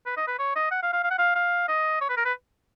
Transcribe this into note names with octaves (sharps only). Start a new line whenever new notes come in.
B4
D#5
B4
C#5
D#5
F#5
F5
F5
F5
F#5
F5
F5
D#5
C#5
B4
A#4
B4